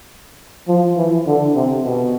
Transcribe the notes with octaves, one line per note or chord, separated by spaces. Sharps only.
F3
E3
D3
C3
B2